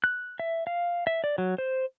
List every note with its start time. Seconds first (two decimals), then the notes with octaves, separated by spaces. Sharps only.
0.04 F#6
0.40 E5
0.67 F5
1.07 E5
1.24 D5
1.38 F#3
1.58 C5